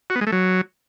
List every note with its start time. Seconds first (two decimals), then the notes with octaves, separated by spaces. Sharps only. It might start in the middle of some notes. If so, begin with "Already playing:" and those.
0.10 F#4
0.16 B3
0.21 G#3
0.27 A3
0.32 F#3